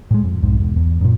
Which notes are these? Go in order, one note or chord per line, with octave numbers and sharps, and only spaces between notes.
A2 G#3
F2
B1 F2 G#2
E1
E2
F#2 A#2